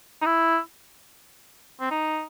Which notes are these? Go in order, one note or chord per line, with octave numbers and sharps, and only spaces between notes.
D#4
E4
C4
D#4